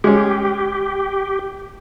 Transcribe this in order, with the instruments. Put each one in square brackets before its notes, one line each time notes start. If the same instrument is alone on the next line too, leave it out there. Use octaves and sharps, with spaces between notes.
[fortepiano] G#3 C#4 [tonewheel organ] G4